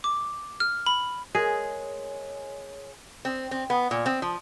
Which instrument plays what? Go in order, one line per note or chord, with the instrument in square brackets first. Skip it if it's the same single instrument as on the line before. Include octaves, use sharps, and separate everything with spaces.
[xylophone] D6
F6
B5
[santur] G#3 [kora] G#4 [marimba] A#4 [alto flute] C#5
[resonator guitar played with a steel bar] C4
C4
B3
A#2
C4
F3